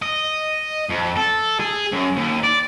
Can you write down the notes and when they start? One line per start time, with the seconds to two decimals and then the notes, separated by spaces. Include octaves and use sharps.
0.02 D#5
0.90 F2
1.17 A4
1.59 G#4
1.92 F#2
2.16 D#2
2.43 D5